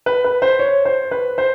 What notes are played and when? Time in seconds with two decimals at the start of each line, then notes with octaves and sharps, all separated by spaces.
0.06 B4
0.24 B4
0.42 C5
0.59 C#5
0.85 C5
1.11 B4
1.38 C5